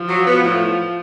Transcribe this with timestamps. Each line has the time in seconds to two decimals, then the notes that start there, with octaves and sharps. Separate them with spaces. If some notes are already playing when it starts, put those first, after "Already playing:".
Already playing: F3
0.09 F#3
0.26 B3
0.43 A2